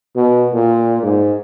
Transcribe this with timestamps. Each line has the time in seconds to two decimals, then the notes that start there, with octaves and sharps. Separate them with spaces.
0.16 B2
0.53 A#2
1.03 G#2